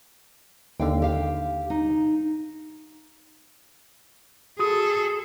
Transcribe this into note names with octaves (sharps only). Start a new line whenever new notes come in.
D#2 D3 F5 G5
G4 F5
D#4
F#4 G#4 A4 D#6